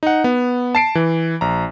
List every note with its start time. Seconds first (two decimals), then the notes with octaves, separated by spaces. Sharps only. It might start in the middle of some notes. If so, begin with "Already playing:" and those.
0.03 D#4 F#5
0.24 B3
0.75 A5 C7 D7
0.95 E3
1.41 A#1 A#5